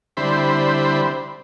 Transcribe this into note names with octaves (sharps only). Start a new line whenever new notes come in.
D3 G3 C4 E4 C5 B5